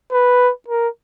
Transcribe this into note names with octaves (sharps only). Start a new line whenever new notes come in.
B4
A#4